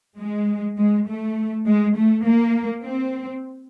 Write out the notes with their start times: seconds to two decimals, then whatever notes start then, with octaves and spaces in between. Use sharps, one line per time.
0.19 G#3
0.78 G#3
1.08 A3
1.66 G#3
1.97 A3
2.25 A#3
2.85 C4